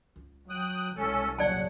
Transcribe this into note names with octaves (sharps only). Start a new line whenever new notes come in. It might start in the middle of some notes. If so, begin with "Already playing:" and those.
C#2
F#3 G5 D#6 F#6
C2 B2 G#3 C#4 A4
D#1 G2 C#3 F#3 D5 F#5 A5